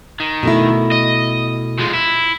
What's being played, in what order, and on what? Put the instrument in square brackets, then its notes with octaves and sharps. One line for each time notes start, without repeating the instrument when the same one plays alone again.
[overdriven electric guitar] D#3
[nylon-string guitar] B2 A3 E4
[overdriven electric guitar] D#5
F3 G#3
E4